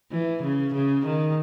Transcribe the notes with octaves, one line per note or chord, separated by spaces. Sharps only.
E3
C#3
C#3
D#3